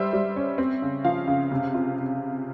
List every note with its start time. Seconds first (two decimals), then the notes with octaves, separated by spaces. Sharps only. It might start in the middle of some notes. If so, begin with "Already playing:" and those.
Already playing: G3 C5 E5
0.13 G3
0.36 C#4
0.58 C4
0.82 C#3
1.05 F3 F5
1.27 C#3
1.52 C3
1.74 F4